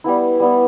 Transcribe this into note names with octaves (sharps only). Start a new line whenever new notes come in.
G3 B3 E4
G3 B3 E4